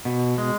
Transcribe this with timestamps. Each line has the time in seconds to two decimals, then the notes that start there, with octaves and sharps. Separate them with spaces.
0.05 B2
0.38 G#3